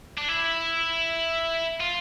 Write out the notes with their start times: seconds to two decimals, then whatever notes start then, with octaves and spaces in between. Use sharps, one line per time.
0.18 D4
0.29 E4
1.80 F4